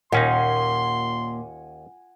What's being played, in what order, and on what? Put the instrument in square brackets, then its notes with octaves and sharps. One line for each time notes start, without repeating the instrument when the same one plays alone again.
[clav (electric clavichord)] D#2 C#4 D#4 [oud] A#2 [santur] F#5 G#5 [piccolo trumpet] C6